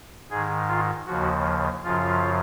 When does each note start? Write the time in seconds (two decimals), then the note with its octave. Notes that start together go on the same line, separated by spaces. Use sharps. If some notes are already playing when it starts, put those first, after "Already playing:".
0.30 G#2 D#3 G#4
0.68 F4
1.07 D#2 C#3 F3 F#4
1.84 F#2 C#3 F3 F4